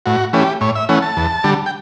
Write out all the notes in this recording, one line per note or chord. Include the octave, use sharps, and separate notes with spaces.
A2 F#4
E3 A3 C#4 G4
A2 C#5
E5
E3 A3 C#4 F#5
A5
E2
D3 G3
G5